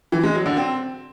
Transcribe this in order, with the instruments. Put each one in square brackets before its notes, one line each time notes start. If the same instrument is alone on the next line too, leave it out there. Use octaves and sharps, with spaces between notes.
[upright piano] E3
G#3
F#3
D3
C4